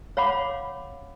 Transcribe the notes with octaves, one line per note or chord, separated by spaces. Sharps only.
C#5 F5 F#5 B5 D6